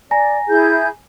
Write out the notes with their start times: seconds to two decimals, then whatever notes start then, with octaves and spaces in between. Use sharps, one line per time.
0.11 D5 G#5 A#5 A#6
0.48 E4 G#4 G6